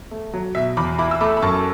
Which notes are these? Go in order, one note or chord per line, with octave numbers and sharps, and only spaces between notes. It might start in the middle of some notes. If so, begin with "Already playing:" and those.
A3
F#3
B2 E5
E2 B5 D6
E4 B5 D6
E6
A3 B5 D6
B5
F#2 A5 C#6